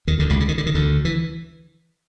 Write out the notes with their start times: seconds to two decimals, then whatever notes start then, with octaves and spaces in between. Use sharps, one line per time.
0.07 D#2 D#3
0.19 D2 D3
0.29 C#2 C#3
0.40 D3
0.48 D#3
0.58 D3
0.66 D#3
0.74 D2 D3
1.05 E3